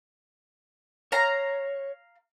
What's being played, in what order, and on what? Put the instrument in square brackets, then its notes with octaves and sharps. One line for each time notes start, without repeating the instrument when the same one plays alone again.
[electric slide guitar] C#5 [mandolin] F5 A#5